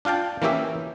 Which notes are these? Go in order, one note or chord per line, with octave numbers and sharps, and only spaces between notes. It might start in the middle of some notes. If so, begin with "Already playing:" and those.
D4 F4 F5 G5 A5
E3 A#3 C#4 G4 E5